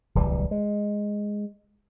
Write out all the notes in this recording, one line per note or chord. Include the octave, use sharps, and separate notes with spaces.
D1 C2 E3 G3
G#3